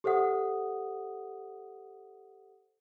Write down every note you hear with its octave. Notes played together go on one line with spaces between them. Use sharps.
G4 A4 C5 E5 F#5 D#6